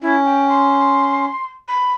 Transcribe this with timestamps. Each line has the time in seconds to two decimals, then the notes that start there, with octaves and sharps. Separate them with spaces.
0.02 C#4 E4
0.25 G5
0.49 C6
1.68 B5